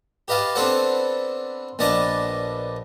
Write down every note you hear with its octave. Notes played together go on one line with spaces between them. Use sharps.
G4 B4 D#5 F5 A5
B3 C4 D4 A4 C5 F#5
A#1 B3 D5 D#5 A5 A#5